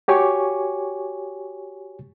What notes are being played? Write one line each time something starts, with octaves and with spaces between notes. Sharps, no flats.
F#4 G4 C#5 G#5 C#6 D6